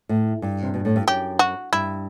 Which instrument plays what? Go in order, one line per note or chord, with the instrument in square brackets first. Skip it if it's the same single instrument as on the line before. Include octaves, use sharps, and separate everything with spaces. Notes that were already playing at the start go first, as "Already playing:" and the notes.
[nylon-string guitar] A2
G2
C3
B2
A2
G2
[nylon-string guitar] F#2 [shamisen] G4
[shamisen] F#4
[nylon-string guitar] G2 [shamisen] E4